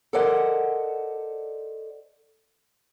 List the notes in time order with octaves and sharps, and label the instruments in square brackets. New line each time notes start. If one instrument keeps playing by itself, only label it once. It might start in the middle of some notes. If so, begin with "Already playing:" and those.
[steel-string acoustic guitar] A4 A#4 C5 D5 D#5 F#5